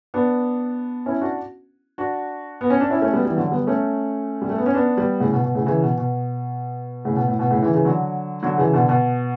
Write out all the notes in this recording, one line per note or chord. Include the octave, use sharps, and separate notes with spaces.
B3 D4
C#4 E4
D4 F#4
D4 F#4
B3
C#4
D4
C#4 E4
A3 C#4
G3 B3
E3 G3
D3 F#3
G3 B3
A3 C#4
G3
A3
B3
C#4
B3 D4
G3 B3
A2 C#3
B2
B2
A2 C#3
C#3 E3
B2
B2
A2 C#3
B2
A2
B2
A2 C#3
C#3 E3
C#3 E3
D3 F#3
D3 F#3
C#3 E3
B2 D3
B2